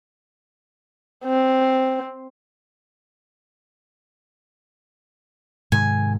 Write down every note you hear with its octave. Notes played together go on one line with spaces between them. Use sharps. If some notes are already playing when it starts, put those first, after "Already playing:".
C4
G#2 C3 D#3 G#5